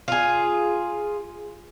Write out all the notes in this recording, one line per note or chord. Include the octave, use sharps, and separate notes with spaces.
F4 G#4